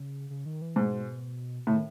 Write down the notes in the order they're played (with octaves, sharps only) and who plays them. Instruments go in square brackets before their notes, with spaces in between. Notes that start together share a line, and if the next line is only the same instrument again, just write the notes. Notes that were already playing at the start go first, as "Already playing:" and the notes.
Already playing: [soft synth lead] C#3
C#3
D#3
E3
[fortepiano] G#2 [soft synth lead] B2
[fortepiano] A2 [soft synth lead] C#3
[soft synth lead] D#3